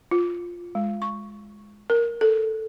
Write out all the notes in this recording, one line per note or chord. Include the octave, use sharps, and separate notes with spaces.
F4
G#3
C#6
A#4
A4